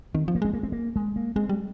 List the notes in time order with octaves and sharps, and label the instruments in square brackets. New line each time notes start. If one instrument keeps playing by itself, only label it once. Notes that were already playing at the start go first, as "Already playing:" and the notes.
[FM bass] D#3 [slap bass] C4
[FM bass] F3
[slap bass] A#3
[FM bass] G#3 [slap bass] C4
[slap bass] A#3
C4
A#3
G#3
A#3
[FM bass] G#3 [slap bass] C4
[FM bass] G3